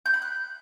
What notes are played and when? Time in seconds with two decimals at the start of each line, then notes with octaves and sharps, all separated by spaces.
0.06 G6
0.14 B5
0.22 F#6